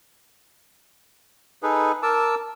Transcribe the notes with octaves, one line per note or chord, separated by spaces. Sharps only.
D#4 G#4 A4 B4
A#4 A5 D6 E6